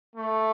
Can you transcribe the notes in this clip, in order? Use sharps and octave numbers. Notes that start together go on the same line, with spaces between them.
A3